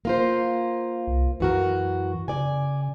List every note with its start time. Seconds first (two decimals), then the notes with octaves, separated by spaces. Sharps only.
0.05 A#3 F4 C5
1.07 C2
1.40 F#2 E3 F#4 A#4
2.28 C#3 D5 G#5